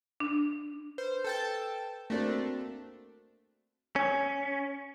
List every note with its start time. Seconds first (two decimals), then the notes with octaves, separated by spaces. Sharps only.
0.20 D4
0.98 B4 C5
1.24 A4 G5 A5
2.10 A3 A#3 C4 D4 F#4 A#4 A#6
3.96 C#4